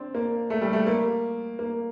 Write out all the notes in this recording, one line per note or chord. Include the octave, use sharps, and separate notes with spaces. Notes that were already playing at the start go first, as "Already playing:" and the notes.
Already playing: C4 D4
A#3
A3
G3
A3
A#3
A#3